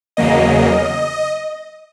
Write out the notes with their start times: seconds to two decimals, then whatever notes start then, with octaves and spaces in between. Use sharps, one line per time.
0.17 E2 C#3 F#3 A#3 D#5